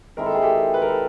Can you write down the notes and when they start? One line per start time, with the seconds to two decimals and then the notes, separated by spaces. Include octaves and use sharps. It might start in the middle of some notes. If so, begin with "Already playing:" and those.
0.17 D#3 G#3 C4 E4 A#4
0.26 A4
0.35 G#4
0.42 G4 A4
0.74 B4
0.82 A#4
0.89 A4